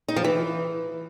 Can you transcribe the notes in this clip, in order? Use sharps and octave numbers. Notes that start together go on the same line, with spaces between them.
D#4
F3
E3